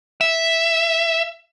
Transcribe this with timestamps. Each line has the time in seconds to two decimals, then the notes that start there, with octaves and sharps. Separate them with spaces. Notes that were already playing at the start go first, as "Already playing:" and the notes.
0.21 E5